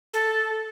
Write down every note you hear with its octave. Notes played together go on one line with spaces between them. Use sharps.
A4